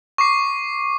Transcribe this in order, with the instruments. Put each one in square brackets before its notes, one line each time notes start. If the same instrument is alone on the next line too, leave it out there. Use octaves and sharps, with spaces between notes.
[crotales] C#6 D6 C7